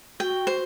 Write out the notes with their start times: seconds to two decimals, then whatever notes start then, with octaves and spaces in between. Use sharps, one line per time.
0.20 F#4 G5
0.47 C5